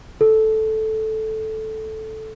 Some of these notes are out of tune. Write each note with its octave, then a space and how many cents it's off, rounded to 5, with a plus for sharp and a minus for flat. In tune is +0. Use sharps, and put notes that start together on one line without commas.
A4 -5